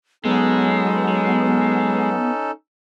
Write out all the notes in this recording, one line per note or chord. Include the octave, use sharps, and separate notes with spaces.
F#3 G#3 B3 C#4 D#4 A4